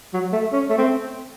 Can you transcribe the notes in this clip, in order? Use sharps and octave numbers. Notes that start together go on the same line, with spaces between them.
F#3
A3
C#4
A3
C4